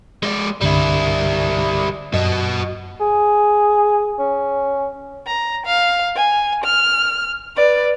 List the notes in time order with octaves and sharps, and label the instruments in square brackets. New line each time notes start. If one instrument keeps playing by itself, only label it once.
[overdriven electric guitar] G#3 D5
[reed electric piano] C2 G2 D3 [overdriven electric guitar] G3 E4
[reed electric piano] F#2 [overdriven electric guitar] F#4 D#5
[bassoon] G#4
C#4
[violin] A#5
F5
G#5
F6
B4 D5